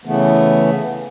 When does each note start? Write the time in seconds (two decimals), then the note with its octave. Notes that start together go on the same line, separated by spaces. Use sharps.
0.05 C#3 E3 A3 B3